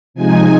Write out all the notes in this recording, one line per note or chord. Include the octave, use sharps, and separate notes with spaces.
C3 F3 G#3 D#4 G#5